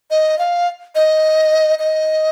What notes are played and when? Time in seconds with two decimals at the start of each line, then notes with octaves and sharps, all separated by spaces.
0.11 D#5
0.39 F5
0.95 D#5
1.79 D#5